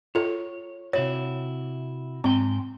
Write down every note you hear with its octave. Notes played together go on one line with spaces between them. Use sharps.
F4 A4 C#5
C3 E4 F#4 C#5
G#2 C4 G5 C6